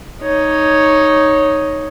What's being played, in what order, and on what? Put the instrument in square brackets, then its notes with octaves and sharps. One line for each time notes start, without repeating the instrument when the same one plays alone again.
[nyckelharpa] D#4 C#5